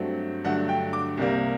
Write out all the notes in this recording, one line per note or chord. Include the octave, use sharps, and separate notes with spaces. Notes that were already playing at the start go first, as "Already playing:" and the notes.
Already playing: G2 F#3 A3 C4
G2 D3 F#3 A3 F#5
G5
D6
C2 C3 G3 A#3